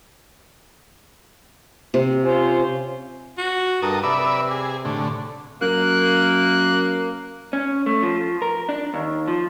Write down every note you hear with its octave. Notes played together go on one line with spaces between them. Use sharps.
C3
C#4 F4 C5
F#4
G2 A4 A#4 D#6
C3 B4 D5 E5
G#4
A2 D3
F#2 A#3 F#6
C#4
A3
F3
A#4
D4
D#2
F3